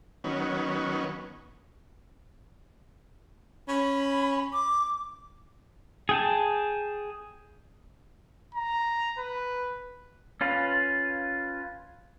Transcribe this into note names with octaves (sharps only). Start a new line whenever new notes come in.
D#3 F#3 B3 C#4
C#4 B5
D6
G#4 G5 A5
A#5
B4
C#4 F4 B4 F5